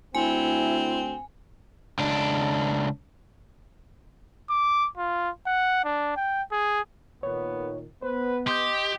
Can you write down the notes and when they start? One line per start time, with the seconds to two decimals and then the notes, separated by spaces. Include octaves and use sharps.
0.15 D2 C4 E4 G#5
1.99 C#2 D4
4.50 D6
4.97 F4
5.46 F#5
5.84 D4
6.16 G5
6.52 G#4
7.23 A#2 D#3 B3 C#5
8.02 B3 B4 C5
8.47 G4 D#5 C6 D#6 G6